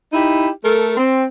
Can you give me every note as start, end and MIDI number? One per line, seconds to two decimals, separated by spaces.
0.12 0.48 63
0.12 0.48 64
0.12 0.48 67
0.63 0.94 57
0.63 0.94 69
0.63 0.94 70
0.97 1.24 60